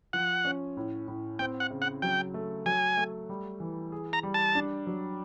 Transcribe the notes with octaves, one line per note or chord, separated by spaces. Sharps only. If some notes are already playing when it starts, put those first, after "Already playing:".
F3 F#5
C#4
A2
A2
C4 G5
F#5
C#3
F#5
F#3 G5
A3
F#3 G#5
A3
G3
E3
G#4
A#5
G3
A5
D4
F#3